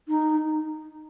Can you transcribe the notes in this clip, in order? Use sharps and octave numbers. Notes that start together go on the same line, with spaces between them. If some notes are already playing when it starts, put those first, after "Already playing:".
D#4